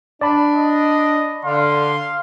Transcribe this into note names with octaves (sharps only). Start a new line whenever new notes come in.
D4 D5 A5 B5
D#5
D3 F5 C6